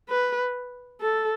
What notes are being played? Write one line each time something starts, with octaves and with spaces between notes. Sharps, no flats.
B4
A4